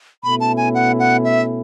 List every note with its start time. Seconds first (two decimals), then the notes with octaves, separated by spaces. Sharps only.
0.23 B2 A3 C#4 E4 B5
0.40 A5
0.57 G#5
0.74 F#5
0.99 F#5
1.25 E5